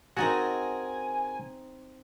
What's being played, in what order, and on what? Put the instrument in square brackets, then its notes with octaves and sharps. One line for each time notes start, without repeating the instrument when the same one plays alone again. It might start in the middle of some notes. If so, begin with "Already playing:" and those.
[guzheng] C4 D#4 A5 [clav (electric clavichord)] F#4 F#5 [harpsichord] G#4 A#4 [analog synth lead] G#5